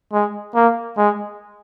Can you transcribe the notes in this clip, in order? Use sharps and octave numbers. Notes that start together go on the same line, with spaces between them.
G#3
A#3
G#3